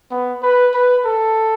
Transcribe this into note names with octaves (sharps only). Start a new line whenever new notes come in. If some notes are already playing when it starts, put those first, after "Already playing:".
B3
B4
B4
A4